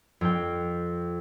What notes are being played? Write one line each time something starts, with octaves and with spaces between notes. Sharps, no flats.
F2 G5